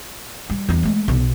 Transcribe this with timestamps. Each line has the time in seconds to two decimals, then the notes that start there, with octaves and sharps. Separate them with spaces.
0.50 G3
0.69 E2 G2
0.83 G#3 A3
1.08 B1 B2